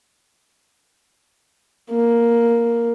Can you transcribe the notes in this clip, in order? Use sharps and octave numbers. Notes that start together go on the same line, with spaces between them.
A#3